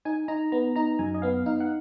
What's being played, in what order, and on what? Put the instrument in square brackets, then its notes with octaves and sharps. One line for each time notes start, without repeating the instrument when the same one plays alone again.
[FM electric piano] D#4 G#5
D#4 A#5
B3 A#5
D#4 A#5
F#2 G#5
D#5
B3 F5
D#4 F5
F#5